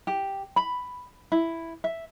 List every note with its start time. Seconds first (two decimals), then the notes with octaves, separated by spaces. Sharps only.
0.07 G4
0.56 B5
1.32 E4
1.84 E5